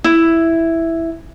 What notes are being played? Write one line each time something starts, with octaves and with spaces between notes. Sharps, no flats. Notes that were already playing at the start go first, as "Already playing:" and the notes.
E4